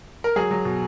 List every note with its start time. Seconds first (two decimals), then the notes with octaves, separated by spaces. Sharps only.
0.24 A#4
0.36 F#3 G#4
0.51 F#3
0.65 B2